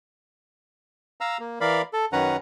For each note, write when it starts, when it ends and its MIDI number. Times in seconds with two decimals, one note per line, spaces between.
1.21 1.37 77
1.21 1.37 82
1.21 1.37 88
1.40 1.59 58
1.61 1.82 52
1.61 1.82 70
1.61 1.82 74
1.61 1.82 77
1.61 1.82 83
1.93 2.05 69
2.13 2.37 42
2.13 2.37 51
2.13 2.37 61
2.13 2.37 71
2.13 2.37 78
2.13 2.37 82